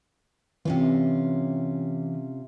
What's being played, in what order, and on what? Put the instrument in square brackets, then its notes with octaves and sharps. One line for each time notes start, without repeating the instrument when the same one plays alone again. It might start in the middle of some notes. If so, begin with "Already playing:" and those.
[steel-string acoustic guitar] C3 C#4 F4 [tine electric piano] E3